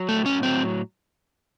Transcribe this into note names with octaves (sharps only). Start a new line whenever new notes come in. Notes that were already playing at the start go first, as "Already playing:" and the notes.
Already playing: F#3
A3
A2
C#4
F#3 C4